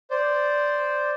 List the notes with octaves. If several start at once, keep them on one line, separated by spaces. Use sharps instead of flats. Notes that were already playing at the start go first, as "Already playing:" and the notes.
C5 D5